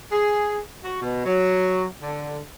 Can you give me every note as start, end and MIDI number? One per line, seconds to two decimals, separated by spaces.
0.12 0.58 68
0.84 1.01 66
1.02 1.23 47
1.25 1.83 54
2.02 2.39 50